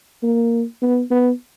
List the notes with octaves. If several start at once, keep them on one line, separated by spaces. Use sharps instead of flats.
A#3
B3
B3